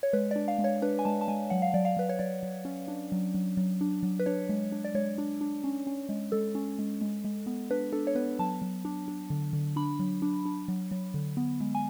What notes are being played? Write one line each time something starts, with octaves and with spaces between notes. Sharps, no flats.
C#5
G#3 B4
D4 D5
F5
G#3
C#5
D4 B4
G#5
G#3 A5
A5
G#3 G#5
F#3 F#5
F5
F#3 D5
F5
F#3 B4
C#5
F#3 D5
F#3
C#4
D4
F#3
F#3
F#3
D4
F#3
B4
D4 C#5
G#3
D4
D5
G#3 C#5
D4
D4
C#4
C#4
G#3
G#3 A4
C#4
G#3
G#3
G#3
B3
D4 B4
D4 A4
C#5
B3 B4
F#3 A5
F#3
D4
D4
D3
D3
D4 B5
F#3
D4
D4
F#3
F#3
D3
B3
G#3
G#5